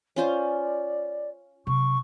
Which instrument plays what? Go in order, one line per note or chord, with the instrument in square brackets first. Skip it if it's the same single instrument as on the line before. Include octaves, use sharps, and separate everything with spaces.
[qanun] C#4 F4 C5 [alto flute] D5
[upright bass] C3 F#3 [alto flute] C#6